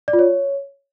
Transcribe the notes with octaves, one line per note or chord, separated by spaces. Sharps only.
D5
F4
C#5